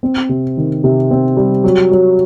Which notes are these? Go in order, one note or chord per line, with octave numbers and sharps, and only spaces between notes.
C4
C3
D#3
C3
C4
G3
F#3
F#3